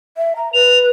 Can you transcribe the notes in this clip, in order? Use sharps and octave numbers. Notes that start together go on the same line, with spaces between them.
E5
A#5
B4 F7